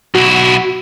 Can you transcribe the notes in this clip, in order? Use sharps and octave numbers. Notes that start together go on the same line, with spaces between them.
B1 E4 F#4